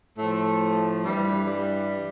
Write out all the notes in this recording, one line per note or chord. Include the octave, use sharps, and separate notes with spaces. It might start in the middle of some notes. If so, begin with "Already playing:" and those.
A2 F3 A3
G2 E3 G3
G3